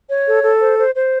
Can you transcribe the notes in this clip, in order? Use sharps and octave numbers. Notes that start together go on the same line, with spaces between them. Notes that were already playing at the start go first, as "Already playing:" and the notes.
C#5
A4
A4
C5
C5
C5